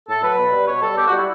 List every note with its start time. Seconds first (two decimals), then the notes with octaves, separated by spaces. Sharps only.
0.09 A2 A4
0.23 F#3 B4
0.38 B2
0.53 G3
0.68 B2 C#5
0.82 G3 A4
0.97 B2 G4
1.07 F#4
1.13 G3 E4